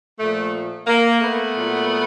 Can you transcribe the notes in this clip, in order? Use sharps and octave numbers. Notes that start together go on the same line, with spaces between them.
A#2 F3 A3
A#3
A3 B3
A#2 F#3